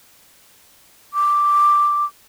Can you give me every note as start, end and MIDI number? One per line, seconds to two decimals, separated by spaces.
1.14 2.05 86